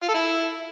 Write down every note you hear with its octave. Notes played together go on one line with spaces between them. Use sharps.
F4
A4
E4